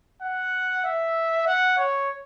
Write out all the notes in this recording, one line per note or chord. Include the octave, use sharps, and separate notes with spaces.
F#5
E5
F#5
C#5